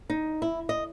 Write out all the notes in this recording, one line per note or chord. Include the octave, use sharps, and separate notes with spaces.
D#4
E4
D#5